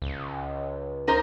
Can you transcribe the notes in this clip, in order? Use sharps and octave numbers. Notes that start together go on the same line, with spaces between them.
C#2
D#4 A#4 C5